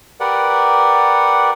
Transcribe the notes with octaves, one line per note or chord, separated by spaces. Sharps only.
G4 A#4 B4 D5 F#5